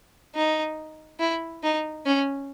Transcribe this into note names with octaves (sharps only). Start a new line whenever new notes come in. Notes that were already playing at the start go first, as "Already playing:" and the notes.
D#4
E4
D#4
C#4